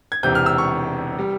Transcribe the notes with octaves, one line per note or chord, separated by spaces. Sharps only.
G#6
E1 E2 C3 G6
F6
E6
C#6
G3